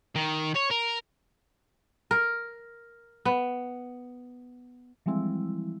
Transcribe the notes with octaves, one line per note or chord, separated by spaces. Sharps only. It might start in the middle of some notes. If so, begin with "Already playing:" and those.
D#3
C#5
A#4
A#4
B3
E3 F3 G3 G#3 C4 E4